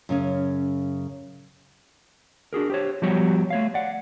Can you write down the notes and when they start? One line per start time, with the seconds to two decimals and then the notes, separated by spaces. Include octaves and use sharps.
0.09 F#2 C#3 C#4
2.53 D4 F#4 G#4 A#4
2.70 G4 C5 C#5
3.02 F3 G3 B3 F#4 G4 C#5
3.50 A3 C#5 F5
3.74 D5 F#5